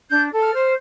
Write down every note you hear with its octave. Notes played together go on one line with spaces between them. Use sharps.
D4 G6
A4
F6
C5